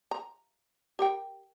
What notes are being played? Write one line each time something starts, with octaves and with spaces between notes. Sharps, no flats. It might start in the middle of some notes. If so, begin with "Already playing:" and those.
A#5
G4 A#4 G5